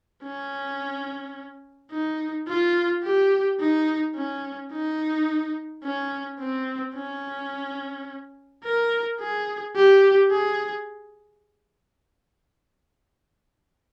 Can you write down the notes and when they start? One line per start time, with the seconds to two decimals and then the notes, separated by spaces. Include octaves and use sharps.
0.23 C#4
1.91 D#4
2.47 F4
3.04 G4
3.60 D#4
4.16 C#4
4.72 D#4
5.84 C#4
6.39 C4
6.95 C#4
8.64 A#4
9.20 G#4
9.76 G4
10.31 G#4